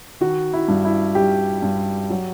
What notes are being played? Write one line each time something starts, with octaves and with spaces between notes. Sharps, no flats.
D#3 F#4
E4
G2
E4
G3 G4
G2
F#3